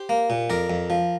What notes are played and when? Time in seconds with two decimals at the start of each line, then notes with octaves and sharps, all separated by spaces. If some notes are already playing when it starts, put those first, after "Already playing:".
Already playing: G4 C5
0.09 A#3
0.30 A#2
0.50 F2 A#4 D5
0.70 F2
0.90 F3